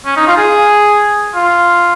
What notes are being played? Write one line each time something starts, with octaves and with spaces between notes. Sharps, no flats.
C#4
D#4
F4
G#4
F4